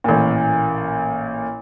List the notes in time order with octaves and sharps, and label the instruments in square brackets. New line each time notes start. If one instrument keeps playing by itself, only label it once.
[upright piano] A1 A#2